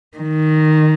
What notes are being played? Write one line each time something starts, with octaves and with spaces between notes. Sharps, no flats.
D#3